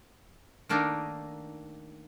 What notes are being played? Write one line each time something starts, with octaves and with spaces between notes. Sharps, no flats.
D#3 A3 A#3 D4 D#4